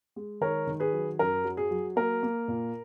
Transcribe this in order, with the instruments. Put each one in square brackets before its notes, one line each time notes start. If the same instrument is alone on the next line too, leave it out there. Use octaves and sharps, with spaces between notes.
[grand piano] G#3
D#3 A#4 C#5
D#3
G#4 B4
F#3
F#2 A#4
F#3
G#4
F#3
A#3 A#4
A#3
A#2